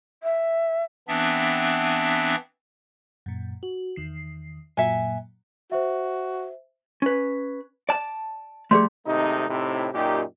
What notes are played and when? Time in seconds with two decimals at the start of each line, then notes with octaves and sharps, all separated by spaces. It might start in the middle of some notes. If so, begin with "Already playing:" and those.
0.23 E5
1.08 E3 B3 C4 D4 E5
3.26 F#2 A#2
3.63 F#4
3.96 E2 D#3 C7
4.77 F#2 A#2 F#3 E5 G#5
5.72 F#4 C5 E5
7.02 C#4 B4
7.89 D5 A5
8.71 F3 G3 A3 G#4 D5 C6
9.06 G#1 C3 A3 D#4
9.49 A2 C3 C4 D#4 E4
9.93 F#2 A#2 D#4 G4